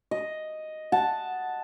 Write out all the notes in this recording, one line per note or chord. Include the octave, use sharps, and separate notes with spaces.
D#5
F#5 A5